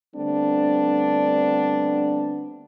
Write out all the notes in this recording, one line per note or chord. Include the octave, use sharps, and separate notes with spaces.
D3 G3 A3 B3 C4 D4